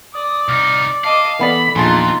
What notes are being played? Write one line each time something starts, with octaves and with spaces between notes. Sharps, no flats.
D5 D#6
C2 D#4 F6
D#5 F5 A5 D6
E3 B3 A4 D5 B5
A#1 E2 E3 D#4 F4 A5 C6